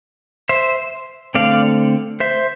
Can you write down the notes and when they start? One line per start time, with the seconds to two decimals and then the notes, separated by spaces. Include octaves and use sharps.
0.49 C5 E5
1.35 D3 A3 C4 D5 F5
2.20 C5 E5